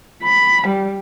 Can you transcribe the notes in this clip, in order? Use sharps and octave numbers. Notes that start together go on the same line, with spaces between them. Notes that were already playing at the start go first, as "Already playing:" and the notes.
B5
G3